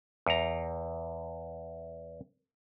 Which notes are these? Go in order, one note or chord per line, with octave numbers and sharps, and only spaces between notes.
E2 A#5